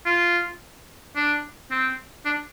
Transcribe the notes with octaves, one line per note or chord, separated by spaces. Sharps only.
F4
D4
C4
D4